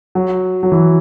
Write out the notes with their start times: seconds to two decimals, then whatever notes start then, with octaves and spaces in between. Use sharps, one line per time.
0.15 F#3
0.63 F#3
0.72 E3